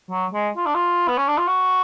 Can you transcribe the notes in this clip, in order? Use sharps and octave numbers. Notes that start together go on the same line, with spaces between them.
F#3
G#3
F4
D4
F4
B3
C#4
D4
F4
F#4